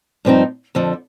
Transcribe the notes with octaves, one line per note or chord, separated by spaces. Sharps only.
G2 F3 C4 D#4
F2 D3 F3